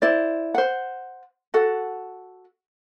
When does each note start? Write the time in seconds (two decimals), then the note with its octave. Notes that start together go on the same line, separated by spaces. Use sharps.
0.02 E4 C5 D5
0.54 C5 F#5
1.54 F#4 A4 F#5